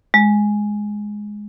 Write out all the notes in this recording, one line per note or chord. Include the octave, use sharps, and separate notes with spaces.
G#3